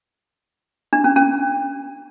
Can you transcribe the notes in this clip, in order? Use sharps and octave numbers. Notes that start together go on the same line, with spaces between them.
D4
C#4
C#4